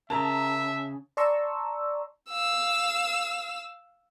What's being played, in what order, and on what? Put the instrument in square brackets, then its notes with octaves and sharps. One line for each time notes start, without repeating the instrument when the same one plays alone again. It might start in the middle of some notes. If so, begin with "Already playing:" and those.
[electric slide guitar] C#3 [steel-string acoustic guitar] A#4 A#5 [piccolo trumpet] E5 [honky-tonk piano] A5
[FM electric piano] D5 A5 A#5 C6 C#6 E6
[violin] F5 E6